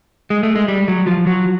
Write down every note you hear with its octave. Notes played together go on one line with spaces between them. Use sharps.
G#3
A3
G#3
G3
F#3
F3
F#3